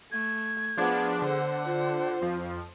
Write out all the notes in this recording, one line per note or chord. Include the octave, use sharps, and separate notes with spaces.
A3 G#6
F3 B3 D4 G#4
D3 C5 F#5
F4 C5
F2 F3